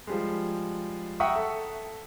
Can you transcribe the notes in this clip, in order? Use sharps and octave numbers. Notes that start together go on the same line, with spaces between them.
F3 G3 G#3
E5 F#5 G5 A#5 C#6 D#6
A4